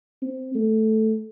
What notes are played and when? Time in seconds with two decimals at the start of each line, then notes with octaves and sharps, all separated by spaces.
0.22 C4
0.55 A3